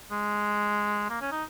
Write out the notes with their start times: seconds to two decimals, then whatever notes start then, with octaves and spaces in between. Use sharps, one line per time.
0.12 G#3
1.10 A#3
1.21 C#4
1.32 D#4